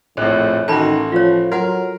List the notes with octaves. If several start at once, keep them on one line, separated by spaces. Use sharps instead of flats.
A#1 F2 A2 C#5 F#6
A1 D#3 F#4 A4 G#5 A5 B5
F3 F4 C#5
F#3 F#4 A#4 F#5